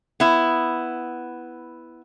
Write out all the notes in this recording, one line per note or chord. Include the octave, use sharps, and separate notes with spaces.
B3 E4